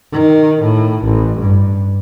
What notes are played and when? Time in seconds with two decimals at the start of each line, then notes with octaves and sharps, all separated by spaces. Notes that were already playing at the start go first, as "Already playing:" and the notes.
0.12 D#3
0.62 A2
1.05 A1
1.39 G2